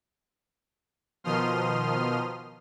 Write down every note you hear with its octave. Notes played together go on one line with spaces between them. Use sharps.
B2 D#3 F3 C6 D#6 F6